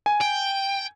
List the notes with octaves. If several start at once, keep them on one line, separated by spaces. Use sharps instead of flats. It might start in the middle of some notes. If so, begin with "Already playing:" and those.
G#5
G5